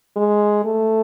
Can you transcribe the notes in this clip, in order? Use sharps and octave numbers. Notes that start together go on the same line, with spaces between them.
G#3
A3